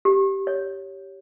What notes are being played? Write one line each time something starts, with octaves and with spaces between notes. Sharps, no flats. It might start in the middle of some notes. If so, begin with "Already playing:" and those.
G4
C#5